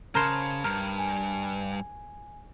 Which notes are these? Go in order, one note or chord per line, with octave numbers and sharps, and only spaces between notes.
C#3 A#4 C5 A5 B5 G#6
G2 A#4
G#5